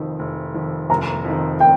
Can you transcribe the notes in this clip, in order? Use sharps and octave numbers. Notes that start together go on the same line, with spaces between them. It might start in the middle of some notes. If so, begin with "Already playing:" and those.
Already playing: F1 F2 D#3
F1
F2 D#3
F1 A#5
F2
D#3
G5